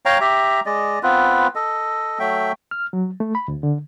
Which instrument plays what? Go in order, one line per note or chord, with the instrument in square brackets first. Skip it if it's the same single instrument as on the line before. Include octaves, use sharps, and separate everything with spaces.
[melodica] C#5 F5 G5 A#5
G4 E5 A#5
G#3 D5 D#5
B3 C4 F4 B4
A4 D#5
F#3 A3 E5 G5
[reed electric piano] F6
F#3
A3
B5
D2
D3